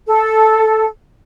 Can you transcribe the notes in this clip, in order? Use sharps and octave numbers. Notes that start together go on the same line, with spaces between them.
A4